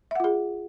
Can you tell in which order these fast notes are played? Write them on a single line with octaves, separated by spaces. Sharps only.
E5 F#5 F4 G#4